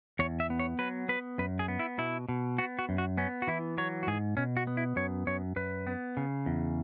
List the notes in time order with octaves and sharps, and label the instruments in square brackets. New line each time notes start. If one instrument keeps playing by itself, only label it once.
[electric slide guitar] E2 C#5
E5
B3
C#5
F#3 B4
B3 B4
F#2 B4
G#4
B3
E4
B2 E4
B2
B3 F#4
F#4
F#2
F#4
B3 C#4
F#4
E3 E4
F#3 C#5
F#4
G#2 G#4
B2 C#4
F#4
B3
E4
F#2 C#5
F#2 C#5
F#2 B4
B3
C#3
E2